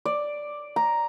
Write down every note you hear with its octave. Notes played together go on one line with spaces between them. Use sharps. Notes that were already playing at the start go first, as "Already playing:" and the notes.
D5
A#5